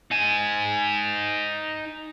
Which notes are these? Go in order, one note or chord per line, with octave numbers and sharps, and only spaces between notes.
D#4 G#5